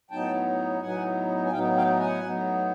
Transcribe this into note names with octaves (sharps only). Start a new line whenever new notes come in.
A2 F#3 B3 D#4 G5 A5
A2 F#3 B3 D#4 F#5 G#5
G#5
A2 F#3 B3 D#4 F5 G5
F5 G5
F#5 G#5
A2 F#3 B3 D#4